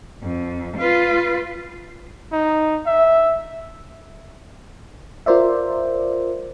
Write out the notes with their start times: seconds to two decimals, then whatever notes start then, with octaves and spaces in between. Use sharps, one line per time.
0.23 F2
0.78 F4 B4
2.33 D#4
2.86 E5
5.26 F4 A#4 C5 D5 E5